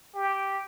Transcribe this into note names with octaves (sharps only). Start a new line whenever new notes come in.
G4